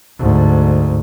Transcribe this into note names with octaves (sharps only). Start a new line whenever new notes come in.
D2 G#2